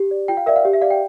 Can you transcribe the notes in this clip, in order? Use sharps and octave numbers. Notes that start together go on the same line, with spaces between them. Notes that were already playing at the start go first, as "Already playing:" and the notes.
Already playing: G4
D5
F4 G5
F5
A#4 D5 E5
F5
G4
E5
D5 F5
G5